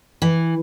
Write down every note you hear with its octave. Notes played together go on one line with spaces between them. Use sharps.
E3